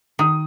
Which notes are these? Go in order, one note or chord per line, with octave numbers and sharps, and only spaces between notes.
D#3 D#6